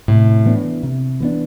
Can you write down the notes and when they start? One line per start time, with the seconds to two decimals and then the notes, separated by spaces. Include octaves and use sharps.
0.08 A2 C3
0.46 E3 B3 D4
0.83 C3
1.20 E3 B3 D4